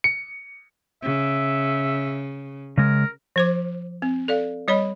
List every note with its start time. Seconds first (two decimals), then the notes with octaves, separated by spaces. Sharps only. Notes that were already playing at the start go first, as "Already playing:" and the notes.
0.04 C#7
1.03 C#3 E5
2.78 C#3 G#3 A#4
3.36 F3 C5 D6
4.02 C4
4.28 A4 D5 F5
4.68 G3 C#5 D#5 B5